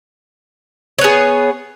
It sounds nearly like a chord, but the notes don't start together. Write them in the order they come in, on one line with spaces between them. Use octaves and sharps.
C#5 B3 G#4